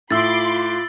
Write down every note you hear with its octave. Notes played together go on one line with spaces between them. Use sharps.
A2 F4 B5 C6 D6 E6 A6